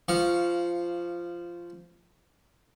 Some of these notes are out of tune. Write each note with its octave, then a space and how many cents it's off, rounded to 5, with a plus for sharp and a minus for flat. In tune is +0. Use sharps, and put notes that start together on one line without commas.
F3 -15 F5 +0 C#6 +0